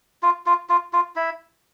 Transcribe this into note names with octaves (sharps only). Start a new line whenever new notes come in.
F4
F4
F4
F4
E4